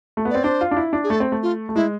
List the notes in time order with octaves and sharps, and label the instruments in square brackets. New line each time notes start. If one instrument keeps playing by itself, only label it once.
[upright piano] A3
B3
[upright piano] C4 [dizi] D5
[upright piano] D4 [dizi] C5
[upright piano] F4
D4
E4
D4
[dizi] G#4
[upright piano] A3 [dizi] A4
[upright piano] C4
A3
[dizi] F4
[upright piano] A3
[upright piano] G#3 [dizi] E4